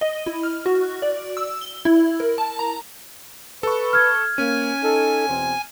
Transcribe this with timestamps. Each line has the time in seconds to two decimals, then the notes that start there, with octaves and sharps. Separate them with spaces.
0.01 D#5
0.26 E4
0.43 F6
0.66 F#4
1.02 D5
1.37 E6
1.61 G7
1.85 E4
2.20 A#4
2.38 A5
2.59 A#5
3.63 A4 B4 C#6
3.93 F6 G#6
4.38 A#3 C#4 G#5
4.82 D#4 A4
5.28 E2 B2 C4